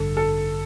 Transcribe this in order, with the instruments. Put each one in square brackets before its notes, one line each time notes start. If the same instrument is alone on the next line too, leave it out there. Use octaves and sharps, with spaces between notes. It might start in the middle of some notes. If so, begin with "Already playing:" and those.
Already playing: [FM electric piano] A1 G2 D3 [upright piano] A4
[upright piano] A4